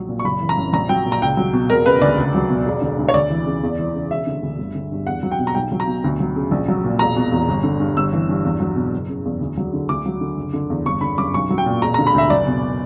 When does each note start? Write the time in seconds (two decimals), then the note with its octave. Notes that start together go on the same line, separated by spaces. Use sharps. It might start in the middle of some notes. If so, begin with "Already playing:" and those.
Already playing: A#1 F#3
0.09 A#2
0.19 C#6
0.25 F#1 B5
0.41 E3
0.49 A#5
0.57 F#2
0.73 A#1 A#5
0.89 F#3 G5
1.06 A#2
1.12 A#5
1.22 C#2 G5
1.37 F#3
1.53 B2
1.70 E1 A#4
1.85 C#3 B4
2.01 D2 D5
2.18 C#2
2.35 F#3
2.50 B2
2.66 E1
2.82 D3
2.99 D2
3.09 C#5
3.14 D2 D5
3.30 E3
3.46 C#3
3.63 E2
3.79 E3
3.95 C#3
4.11 E1 E5
4.27 D3
4.43 D2
4.58 G1
4.75 D3
4.92 G2
5.07 E2 F#5
5.23 F#3
5.31 G5
5.39 B2
5.47 A#5
5.55 B1 G5
5.72 F#3
5.80 A#5
5.88 B2
6.04 D2
6.20 F#3
6.36 C#3
6.51 A#1
6.68 F#3
6.84 A#2
6.99 E1 A#5
7.16 B2
7.32 E2
7.49 G1
7.64 D3
7.80 G2
7.96 G1 E6
8.13 E3
8.29 G2
8.45 E2
8.60 F#3
8.76 B2
8.93 F#1
9.09 C#3
9.25 E2
9.41 D2
9.57 F#3
9.74 D3
9.89 D2 D6
10.06 F#3
10.21 D3
10.37 F#1
10.53 D3
10.70 E2
10.86 G1 C#6
11.01 D3 B5
11.18 F#2 D6
11.34 B1 C#6
11.50 F#3
11.58 G5
11.66 A#2
11.81 E1 A#5
11.94 A#5
11.99 D3
12.07 B5
12.14 D2 E5
12.30 F#1 D5
12.47 B2